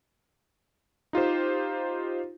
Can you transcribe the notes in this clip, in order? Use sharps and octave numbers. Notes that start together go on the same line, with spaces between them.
D#4 F4 G4 C5